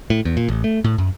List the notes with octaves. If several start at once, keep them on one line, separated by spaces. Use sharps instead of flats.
A2
E2
A#2
A1
A3
A2
F#2